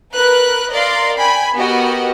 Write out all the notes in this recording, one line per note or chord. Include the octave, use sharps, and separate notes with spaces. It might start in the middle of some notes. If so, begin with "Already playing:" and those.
A#4 B4 F#6
A#4 D5 D#5 F5 C6
G5 G#5 B5
B3 F#4 G4 A#4 D#5